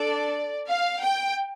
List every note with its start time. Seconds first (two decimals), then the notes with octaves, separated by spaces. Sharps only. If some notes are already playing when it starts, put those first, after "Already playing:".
Already playing: D4 A4 D5
0.69 F5
1.02 G5